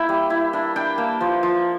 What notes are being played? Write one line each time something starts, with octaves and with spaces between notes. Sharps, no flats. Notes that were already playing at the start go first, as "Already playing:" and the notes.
Already playing: A#3 E4 G5
G3
E4
D4
D4 G5
A#3 A5
F3
F3